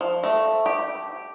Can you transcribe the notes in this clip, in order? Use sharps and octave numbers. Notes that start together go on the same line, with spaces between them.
F3
A3
G4